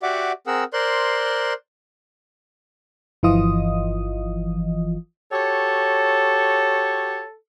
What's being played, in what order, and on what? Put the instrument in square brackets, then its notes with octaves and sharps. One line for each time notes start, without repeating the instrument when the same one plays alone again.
[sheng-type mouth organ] F#4 G4 D5 E5 F#5 D6
C4 G#4 A#4 F#5 E6
A#4 C5 D5 C6 F#6
[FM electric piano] G1 E3 F3 F4 D#5 D#6
[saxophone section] F#4 G4 C#5 [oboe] A4